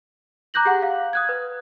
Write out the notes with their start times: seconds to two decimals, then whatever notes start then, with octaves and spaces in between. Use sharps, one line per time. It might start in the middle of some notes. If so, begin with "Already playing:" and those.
0.54 A#5 D6 F#6 G6 A#6 F#7
0.65 G4 G#4 F#5
0.82 F5
1.13 D#6 F#6 G#6
1.29 B4